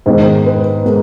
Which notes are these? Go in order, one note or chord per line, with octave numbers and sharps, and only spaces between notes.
G#2 D#3 G#3 B3 C5
B4
G#3 B3 A#4